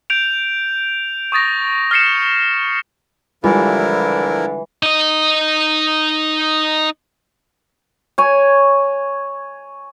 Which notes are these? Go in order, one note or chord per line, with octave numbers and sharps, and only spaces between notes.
G6 D7 F7
C#6 D#6 A6 A#6
F6 A6 C7 C#7 E7
D3 E3 F3 G3 G#3 E4 F4 A#4
D#4 D#5
C#5 G#5